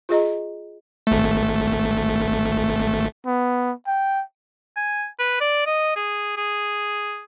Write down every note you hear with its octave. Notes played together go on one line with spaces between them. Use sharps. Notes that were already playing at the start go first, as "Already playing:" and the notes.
F4 G#4 D#5 A#5
G#1 A3
B3
G5
G#5
B4
D5
D#5
G#4
G#4